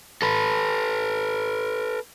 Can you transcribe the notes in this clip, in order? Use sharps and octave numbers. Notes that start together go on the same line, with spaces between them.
A4 B4